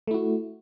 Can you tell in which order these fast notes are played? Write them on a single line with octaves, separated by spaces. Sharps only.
A3 E4 F#4